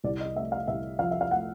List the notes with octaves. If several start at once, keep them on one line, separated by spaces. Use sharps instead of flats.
C2 D5
D#5
A3 E5
F5
C2 E5
F3 F5
E5
F5
A3 F#5